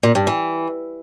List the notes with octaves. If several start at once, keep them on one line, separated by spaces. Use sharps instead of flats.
A#2
G2
E3